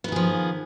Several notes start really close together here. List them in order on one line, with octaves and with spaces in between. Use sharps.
B3 D#3 G#4 F3